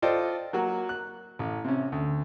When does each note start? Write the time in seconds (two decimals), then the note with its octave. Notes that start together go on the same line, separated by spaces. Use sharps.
0.02 F4 A4 C5 D5 D#5 G5
0.53 F#3 A#3 F#4
0.89 F#6
1.39 A1
1.65 C3 C#4
1.92 D2